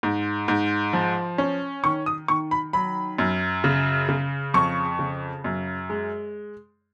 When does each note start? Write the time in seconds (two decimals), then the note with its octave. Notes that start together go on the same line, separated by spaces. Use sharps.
0.03 G#2
0.48 G#2
0.93 F3
1.38 C#4
1.83 D#3 C#6
2.06 D#6
2.28 D#3 C#6
2.51 B5
2.73 F#3 B5
3.18 F#2
3.64 C#3
4.09 C#3
4.54 F2 C#6
4.99 C#3
5.44 F#2
5.90 G#3